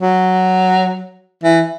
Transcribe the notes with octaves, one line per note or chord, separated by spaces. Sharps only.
F#3
E3